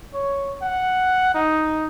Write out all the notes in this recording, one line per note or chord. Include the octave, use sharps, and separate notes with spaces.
C#5
F#5
D#4